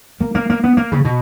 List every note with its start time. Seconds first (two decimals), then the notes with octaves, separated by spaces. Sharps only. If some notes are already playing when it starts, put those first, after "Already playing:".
0.20 A#3
0.35 A#3
0.50 A#3
0.64 B3
0.77 A#3
0.92 C#3
1.05 B2